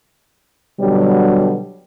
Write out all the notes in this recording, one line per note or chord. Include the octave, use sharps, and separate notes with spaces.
B2 D3 F#3 G3